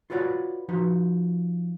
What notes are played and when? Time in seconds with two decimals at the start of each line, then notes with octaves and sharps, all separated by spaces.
0.10 F4 F#4 B4 C#5 D5 F#5
0.69 F3 D#4 F#4 B4